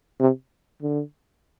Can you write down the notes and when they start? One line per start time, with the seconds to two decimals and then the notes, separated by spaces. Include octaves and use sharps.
0.20 C3
0.82 D3